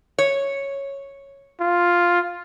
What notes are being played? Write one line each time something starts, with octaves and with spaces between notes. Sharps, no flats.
C#5
F4